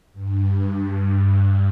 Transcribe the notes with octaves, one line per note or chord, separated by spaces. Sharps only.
G2
G2